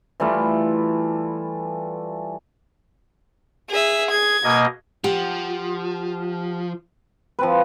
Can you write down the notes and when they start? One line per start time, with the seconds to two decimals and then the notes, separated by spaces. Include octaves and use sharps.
0.20 E3 G3 A3 F4
3.70 G#4 E5
4.11 G#4 G#6
4.44 B2 A#3 D#5
5.04 F3 G4 F#5
7.39 F3 C4 B4